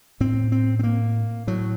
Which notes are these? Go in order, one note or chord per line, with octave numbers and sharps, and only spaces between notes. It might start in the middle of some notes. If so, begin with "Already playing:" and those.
A2 C4
C4
C4
A#3
A2 F#3